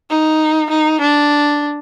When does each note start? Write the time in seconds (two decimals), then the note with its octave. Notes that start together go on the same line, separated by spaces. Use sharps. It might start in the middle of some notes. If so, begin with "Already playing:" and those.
0.11 D#4
0.71 D#4
1.01 D4